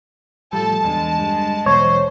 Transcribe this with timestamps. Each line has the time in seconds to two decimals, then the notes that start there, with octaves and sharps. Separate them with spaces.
0.53 A2 F3 G3 A4 A5
0.84 E2 D3 G#3
1.19 G2
1.66 E1 B1 E2 C5 C#5